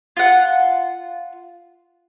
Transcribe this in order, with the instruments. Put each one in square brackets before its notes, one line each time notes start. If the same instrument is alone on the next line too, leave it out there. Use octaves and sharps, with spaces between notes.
[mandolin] F4 F#5